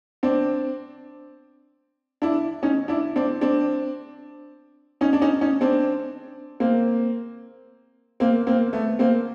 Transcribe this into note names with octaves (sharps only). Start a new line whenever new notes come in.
C4 D4
D4 E4
C#4 D#4
D4 E4
C4 D4
C4 D4
C#4 D#4
D4
C#4 D#4
C#4 D#4
C4 D4
A#3 C4
A#3 C4
A#3 C4
A3 B3
A#3 C4